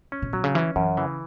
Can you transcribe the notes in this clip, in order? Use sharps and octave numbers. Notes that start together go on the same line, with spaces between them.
C#4
B2
B2 F#3
C#3
E3 C#4
F#2 E3
C#3 E3